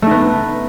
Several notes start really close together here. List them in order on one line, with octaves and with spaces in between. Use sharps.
A3 D#4 B3